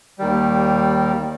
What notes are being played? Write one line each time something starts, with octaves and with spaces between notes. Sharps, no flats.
D#2 D#3 G3